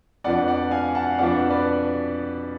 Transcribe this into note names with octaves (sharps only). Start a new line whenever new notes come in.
F2 F3 B3 D4 D5 F#5
D5 F#5
F5 G#5
F#5 A5
F5
F2 F3 B3 D4 D5 F#5
B4 D5